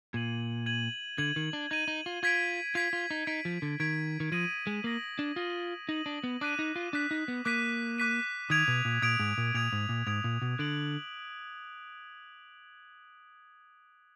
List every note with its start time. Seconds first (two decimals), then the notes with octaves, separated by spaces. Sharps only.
0.13 A#2 G#6 D#7 F#7
0.66 G#6 D#7 F#7
1.18 D3 G#6 D#7 F#7
1.36 D#3
1.53 D4
1.71 D#4 G#6 D#7 F#7
1.88 D#4
2.06 F4
2.23 F4 G#6 B6 D7
2.75 F4 G#6 B6 D7
2.93 F4
3.11 D#4
3.27 D#4 G#6 B6 D7
3.45 F3
3.62 D3
3.80 D#3 G#6 B6 D7
4.20 D#3
4.32 F3 D#6 A#6 D#7 F#7
4.67 G#3
4.84 A#3 D#6 A#6 D#7 F#7
5.19 D4
5.36 F4 D#6 A#6 D#7 F#7
5.89 D#4 D#6 A#6 D#7 F#7
6.06 D4
6.24 B3
6.41 D4 D6 F#6 B6 D#7
6.59 D#4
6.76 F4
6.93 D4 D6 F#6 B6 D#7
7.11 D#4
7.28 B3
7.45 A#3 D6 F#6 B6 D#7
7.98 D6 F#6 B6 D#7
8.50 D#3 D#6 G#6 D7 F7
8.68 B2
8.85 A#2
9.02 A#2 D#6 G#6 D7 F7
9.19 G#2
9.38 A#2
9.54 A#2 D#6 G#6 D7 F7
9.72 G#2
9.89 A#2
10.07 G#2 D#6 G#6 D7 F7
10.24 A#2
10.42 B2
10.58 D3 F#6 D7 F#7